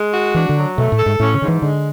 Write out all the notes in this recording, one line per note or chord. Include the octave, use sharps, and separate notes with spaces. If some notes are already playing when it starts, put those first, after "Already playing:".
Already playing: G#3
F#4
E3 D4
D3
F#3
B2 A3
A2
A4
G#2
A2 C#4
C#3
G#2 D3
E3
D3 G#3